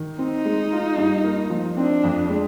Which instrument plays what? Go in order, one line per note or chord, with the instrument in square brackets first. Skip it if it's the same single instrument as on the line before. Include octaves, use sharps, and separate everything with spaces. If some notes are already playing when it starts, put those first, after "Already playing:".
Already playing: [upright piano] D#3
[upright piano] C4 [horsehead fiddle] D#4
[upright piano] G#3
F4
G2
A#3
F3
[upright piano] C4 [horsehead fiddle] D4
[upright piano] F2
G#3